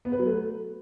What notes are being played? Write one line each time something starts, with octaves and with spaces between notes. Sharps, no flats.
B3
B4
F#3
A3